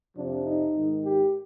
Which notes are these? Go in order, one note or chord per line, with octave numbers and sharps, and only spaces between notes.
F2 C3 F3 D4
D#4
G#2 D#3
G4